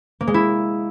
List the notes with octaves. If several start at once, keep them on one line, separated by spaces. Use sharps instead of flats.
A#3
G#3
E4